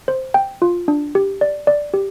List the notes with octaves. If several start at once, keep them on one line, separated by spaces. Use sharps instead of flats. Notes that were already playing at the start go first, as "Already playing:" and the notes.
C5
G5
F4
D4
G4
D5
D5
G4